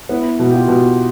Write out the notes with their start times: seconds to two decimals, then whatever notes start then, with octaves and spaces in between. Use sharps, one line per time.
0.09 B3 E4
0.39 B2
0.50 G4
0.54 F4
0.68 B2